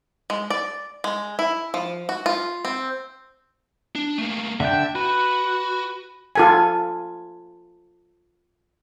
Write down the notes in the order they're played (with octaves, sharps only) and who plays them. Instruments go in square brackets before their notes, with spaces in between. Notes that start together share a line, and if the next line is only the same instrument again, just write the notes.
[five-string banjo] G#3
D5
G#3
E4
F3
F#4
F4
C4
[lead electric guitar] D4
A3 A#3
[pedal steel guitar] D3 D4 G5 [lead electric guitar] E5
[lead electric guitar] F#4 [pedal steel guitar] B4
[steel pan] F4 A4 G#5